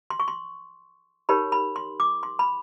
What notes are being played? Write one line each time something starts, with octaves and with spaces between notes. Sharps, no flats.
C6
C#6
C6
D#4 G4 A#4 C#5 B5
B5
C6
D6
C6
B5